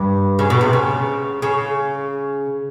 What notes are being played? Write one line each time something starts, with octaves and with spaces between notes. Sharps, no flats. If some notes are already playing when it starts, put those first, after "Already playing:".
Already playing: G2
C#3
B2
C3
C#3
C#3